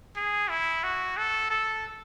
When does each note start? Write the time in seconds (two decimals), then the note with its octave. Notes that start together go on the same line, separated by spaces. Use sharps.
0.16 G#4
0.49 E4
0.83 F#4
1.17 A4
1.50 A4